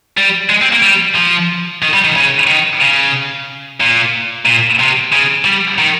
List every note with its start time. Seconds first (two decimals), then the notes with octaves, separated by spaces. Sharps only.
0.17 G3
0.50 G#3
0.62 C4
0.72 A#3
0.82 G3
1.15 F3
1.83 D#3
1.94 G3
2.04 D#3
2.16 C#3
2.47 D#3
2.82 C#3
3.80 A#2
4.46 A#2
4.80 C3
5.13 C#3
5.45 G3
5.79 D#3